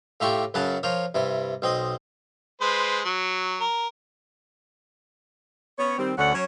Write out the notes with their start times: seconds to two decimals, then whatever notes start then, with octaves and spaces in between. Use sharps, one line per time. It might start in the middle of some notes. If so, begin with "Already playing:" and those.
0.20 A2 F4 G4 E5 G5 C#6
0.54 F#2 C#3 F#3 B4 F#5 A5
0.83 F3 A#4 C5 C#5
1.15 G2 C3 E4
1.62 B1 C4 D#5 D#6
2.61 G#3 B4 C5
3.05 F#3
3.60 A#4
5.79 B3 C#4 C#5
5.98 D#3 G3 C4
6.18 D2 D3 C#4 F#5
6.34 F#3 C#4 C#5